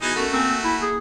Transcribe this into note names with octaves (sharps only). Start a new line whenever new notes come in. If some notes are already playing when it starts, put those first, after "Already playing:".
E3 B3 D#4 F#4 G#4
A3 C#4 F#4 A4 A#4
A#3 C4 G#5
E4
G#4